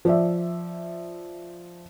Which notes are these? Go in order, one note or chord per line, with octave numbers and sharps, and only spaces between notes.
F3 D5 E5